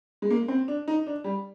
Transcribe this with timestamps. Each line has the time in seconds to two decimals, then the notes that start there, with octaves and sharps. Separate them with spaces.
0.22 G#3
0.31 A#3
0.48 C4
0.68 D4
0.88 D#4
1.07 D4
1.24 G3